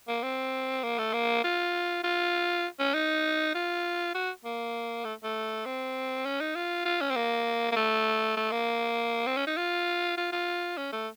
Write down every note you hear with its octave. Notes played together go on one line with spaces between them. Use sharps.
A#3
C4
A#3
A3
A#3
F4
F4
C#4
D#4
F4
F#4
A#3
A3
A3
C4
C#4
D#4
F4
F4
C#4
C4
A#3
A#3
A3
A3
A#3
C4
C#4
D#4
F4
F4
F4
C#4
A3